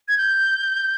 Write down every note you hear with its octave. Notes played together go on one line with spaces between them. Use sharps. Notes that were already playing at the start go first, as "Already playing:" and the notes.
G#6
G6